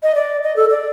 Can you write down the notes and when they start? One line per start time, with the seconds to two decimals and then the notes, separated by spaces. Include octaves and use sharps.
0.03 D#5
0.15 D5
0.43 D#5
0.56 A4
0.70 D5